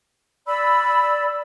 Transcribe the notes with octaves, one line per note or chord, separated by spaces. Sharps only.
D5 B5 E6